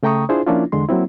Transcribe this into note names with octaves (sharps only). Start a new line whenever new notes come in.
C#3 A3 G5 A#5 C#6 D#6
D4 E4 F4 G#4 C5
F3 A#3 C#4 D4 E4 F4
E2 D3 G#3 C6
F#3 A#3 C4 E4